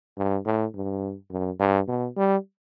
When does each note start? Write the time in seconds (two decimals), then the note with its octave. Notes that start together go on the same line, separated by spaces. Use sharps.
0.17 G2
0.45 A2
0.74 G2
1.31 F#2
1.60 G2
1.88 B2
2.17 G3